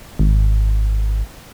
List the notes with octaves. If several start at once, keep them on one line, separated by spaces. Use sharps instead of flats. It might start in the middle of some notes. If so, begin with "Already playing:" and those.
G#1